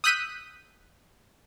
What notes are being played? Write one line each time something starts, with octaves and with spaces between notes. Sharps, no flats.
D#6 E6 F#6 G6 B6 D#7